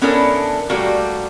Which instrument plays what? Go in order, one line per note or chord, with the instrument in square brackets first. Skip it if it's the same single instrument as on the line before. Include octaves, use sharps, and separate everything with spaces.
[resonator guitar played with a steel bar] B3 C#4 D4 E4 A4 A#4
G3 A3 A#3 F#4 G4